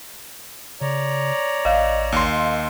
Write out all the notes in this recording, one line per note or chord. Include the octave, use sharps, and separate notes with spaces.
C#3 C#5 D5 A#5
A1 D#5 F5
D#2 C6